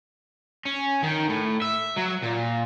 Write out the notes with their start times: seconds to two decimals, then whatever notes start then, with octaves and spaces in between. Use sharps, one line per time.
0.65 C#4
1.03 D#3
1.29 A2
1.62 E5
1.97 F#3
2.23 A#2